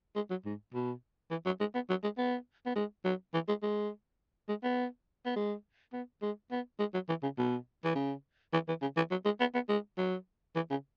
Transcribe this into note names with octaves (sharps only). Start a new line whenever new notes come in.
G#3
F#3
G#2
B2
E3
F#3
G#3
B3
F#3
G#3
B3
B3
G#3
F#3
E3
G#3
G#3
G#3
B3
B3
G#3
B3
G#3
B3
G#3
F#3
E3
C#3
B2
E3
C#3
E3
E3
C#3
E3
F#3
G#3
B3
B3
G#3
F#3
E3
C#3